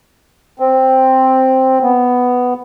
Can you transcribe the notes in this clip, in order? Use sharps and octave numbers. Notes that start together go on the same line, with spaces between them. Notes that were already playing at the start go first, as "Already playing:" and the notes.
C4
B3